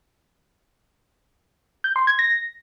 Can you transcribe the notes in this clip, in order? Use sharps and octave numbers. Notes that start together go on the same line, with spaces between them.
G6
C6
G#6
A#6